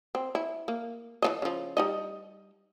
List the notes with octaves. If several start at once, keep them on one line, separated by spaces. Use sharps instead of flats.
C4
E4
A#3
E3 C4 D#5
C#3 F3
G3 D#4 D#5